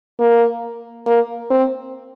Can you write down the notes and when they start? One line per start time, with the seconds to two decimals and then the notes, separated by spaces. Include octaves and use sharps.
0.19 A#3
1.06 A#3
1.50 C4